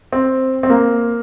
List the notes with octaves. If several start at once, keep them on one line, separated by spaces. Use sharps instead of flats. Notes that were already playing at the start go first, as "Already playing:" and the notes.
C4
C4
A#3